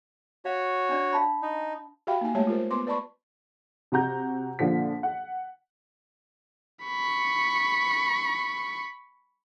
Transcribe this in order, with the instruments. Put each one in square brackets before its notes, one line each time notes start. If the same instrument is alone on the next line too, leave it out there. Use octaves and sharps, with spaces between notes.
[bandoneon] F#4 C#5 [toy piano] F5
[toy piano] C#4 D4 D5
F5 A5 B5
[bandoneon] D#4
[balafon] F#4 G4 E5 F5 G5 B5
A#3 D#4 G#5
G#3 A3 G4 C#5 E5 A5
F4 G4 A#4 C5
B3 B4 C6 D6
B4 D5 A5 B5 C#6
[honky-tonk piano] C3 F#4 A#5 G6
A#2 D3 F3 B6
F#5
[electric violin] B5 C#6